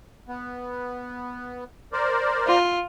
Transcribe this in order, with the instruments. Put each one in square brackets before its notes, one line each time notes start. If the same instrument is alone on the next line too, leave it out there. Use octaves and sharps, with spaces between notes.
[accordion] B3
A#4 C5 D5
[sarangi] F4